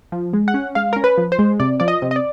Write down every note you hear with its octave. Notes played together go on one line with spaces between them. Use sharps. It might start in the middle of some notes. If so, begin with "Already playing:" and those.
F3
G#3
F#5
C#4
G#3 F5
C#4 A#4
B4
F3
C5
G#3
C3 D5
F3 D5
D#5
C3
D#5
D5